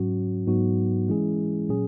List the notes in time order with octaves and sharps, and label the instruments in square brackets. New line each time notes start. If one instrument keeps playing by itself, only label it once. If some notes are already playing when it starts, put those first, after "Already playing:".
Already playing: [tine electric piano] G#2 F#3 C#4 F#4
G#2 F#3 B3 D#4 F#4
E3 G#3 C#4 E4 G#4
A#2 F#3 C#4 G#4